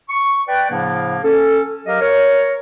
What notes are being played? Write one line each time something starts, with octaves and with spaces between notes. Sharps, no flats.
C#6
B4 D5 G5
A2 C#3 F3 A#3 D4 F#5
C#4 A4
F#3 G4 A#4 D#5 F5
A#4 C#5